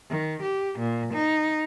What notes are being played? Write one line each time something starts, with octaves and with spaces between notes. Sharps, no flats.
D#3
G4
A#2
D#4